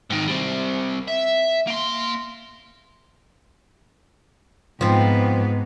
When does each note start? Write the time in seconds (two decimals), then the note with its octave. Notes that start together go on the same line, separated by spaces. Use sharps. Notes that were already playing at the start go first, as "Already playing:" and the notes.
0.10 G#2 D#3
0.28 G3 C4
1.08 E5
1.67 A#3 C6
4.81 G#2 F3 B3 C4